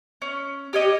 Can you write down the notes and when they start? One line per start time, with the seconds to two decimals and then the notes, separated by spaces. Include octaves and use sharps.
0.22 C#4
0.73 G4 C#5 D#5